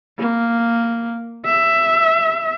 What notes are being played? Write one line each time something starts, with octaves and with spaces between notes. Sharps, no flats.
A#3
E5